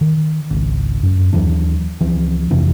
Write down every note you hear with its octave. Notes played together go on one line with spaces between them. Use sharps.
D#3
G#1 C#2
F#2
D#2 E3 F#3 D4
C#2 E3 F3 C4
F2 C3 E3 F3